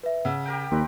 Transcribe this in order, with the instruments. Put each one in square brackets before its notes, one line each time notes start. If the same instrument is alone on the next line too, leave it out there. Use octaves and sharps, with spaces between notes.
[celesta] B4 E5
[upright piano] C#3 [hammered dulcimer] E5 [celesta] F#5
[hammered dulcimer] G4 A#4 G5
[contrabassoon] D#2 [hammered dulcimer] C4 D#4 B4